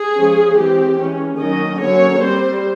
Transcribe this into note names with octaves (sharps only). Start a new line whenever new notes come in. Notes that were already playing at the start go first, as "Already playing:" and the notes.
Already playing: G#4
F3 G#3 C#4
E3 G#3 C4 G4
E3 G#3 C#4
D#3 F#3 A#3 C#4 D#5
D3 F#3 A#3 C#4 C#5
G3 C4 C5